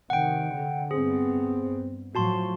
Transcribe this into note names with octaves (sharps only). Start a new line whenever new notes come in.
C3 D#3 F#5 G5
D3
G2 B3 C4 G#4
A2 F3 F#3 F#4 A5 C6